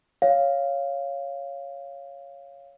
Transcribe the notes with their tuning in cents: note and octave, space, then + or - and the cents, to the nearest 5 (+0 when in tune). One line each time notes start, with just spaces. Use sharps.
C#5 +0 F5 -5